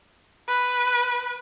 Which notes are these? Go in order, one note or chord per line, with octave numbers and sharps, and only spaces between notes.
B4